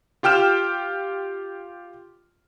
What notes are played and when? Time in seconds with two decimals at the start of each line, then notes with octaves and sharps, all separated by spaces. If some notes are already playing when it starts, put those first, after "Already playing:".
0.23 F4 G4 G5 F6 E7